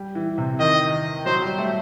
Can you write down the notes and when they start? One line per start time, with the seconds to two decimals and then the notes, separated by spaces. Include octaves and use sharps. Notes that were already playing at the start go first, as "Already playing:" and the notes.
Already playing: G3
0.15 E3
0.38 C3
0.59 D#3 D#5
1.26 F#3 C5
1.42 G3
1.58 A3